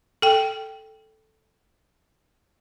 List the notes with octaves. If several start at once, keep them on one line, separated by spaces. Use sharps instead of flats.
A4 G5